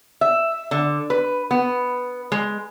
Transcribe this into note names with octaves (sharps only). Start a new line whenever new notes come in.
E5
D3
B4
B3
G#3